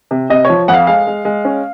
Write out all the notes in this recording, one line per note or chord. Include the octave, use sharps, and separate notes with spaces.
C3
C3 D#5
F3 C#5
F2 F#5
F5
G#3 F5
G#3
G#3
C#4